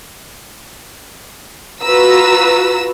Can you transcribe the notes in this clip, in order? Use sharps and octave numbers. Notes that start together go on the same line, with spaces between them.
F4 F#4 B4 A#5 E6